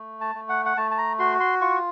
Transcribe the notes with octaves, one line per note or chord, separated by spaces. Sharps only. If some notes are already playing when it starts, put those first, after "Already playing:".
Already playing: A3
A5
A3
F#5
F#5
A3 A5
A5
A#5
F#4 C6
C6
F4 C#6